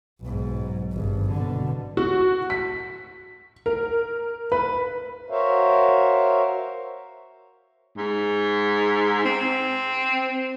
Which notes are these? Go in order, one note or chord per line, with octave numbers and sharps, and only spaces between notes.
B1 G#2
G#1 G2
B2 D3
F#4
B6
A#4
B4
F#4 A#4 C5 C#5 E5 F5
G#2
C4